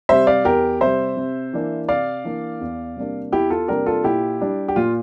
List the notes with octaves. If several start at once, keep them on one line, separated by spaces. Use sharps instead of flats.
C3 G3 C5 E5
D5 F5
E2 G4 A#4
C3 G3 C5 E5
C3
E3 A#3 D4
C3 D5 F5
E3 A#3 D4
E2
C3 G3 A#3 D4
E2 E4 G4
F4 A4
C3 G3 A#3 D4 G4 A#4
F4 A4
A#2 E4 G4
G3 D4
G4
A#2 F4